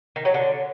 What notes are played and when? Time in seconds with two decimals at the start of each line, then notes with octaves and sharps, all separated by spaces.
0.16 D#3
0.25 F#3
0.34 D3